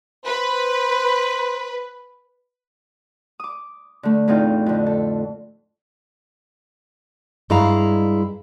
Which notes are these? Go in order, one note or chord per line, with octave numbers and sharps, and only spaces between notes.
B4 C5
D6 D#6
D3 A3
E2 A2 C4 D#4 F4 G5
F2 D3
A4
G2 G#3 E4 F5 A#5